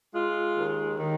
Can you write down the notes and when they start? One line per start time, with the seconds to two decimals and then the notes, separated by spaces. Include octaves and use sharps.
0.14 G#3 F4
0.57 D#2
0.99 D#3